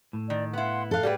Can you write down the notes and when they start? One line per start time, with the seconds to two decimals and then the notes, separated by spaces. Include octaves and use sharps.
0.13 A2
0.30 D#3 D5
0.53 B3 E4 F5 F#5 C6
0.91 A4 F5 F#6
1.03 G3 G#4 B4 D5 F#5 G5